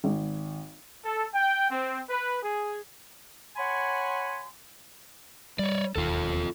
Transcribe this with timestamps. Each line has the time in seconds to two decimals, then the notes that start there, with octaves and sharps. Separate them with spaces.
0.04 G#1
1.05 A4
1.34 G5
1.71 C4
2.09 B4
2.43 G#4
3.56 C#5 F#5 G#5 B5 C6
5.59 G3 C#5 D5
5.96 E1 D#2 F4 A4